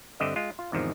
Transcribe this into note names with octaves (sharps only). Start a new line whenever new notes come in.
G2 D3 C4 G4 D#5 E5
G#3 F4
F4
E2 G#2 C3 D#3 F3